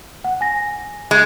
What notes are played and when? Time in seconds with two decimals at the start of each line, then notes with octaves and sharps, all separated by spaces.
0.24 F#5
0.41 G#5 A#6
1.11 G#3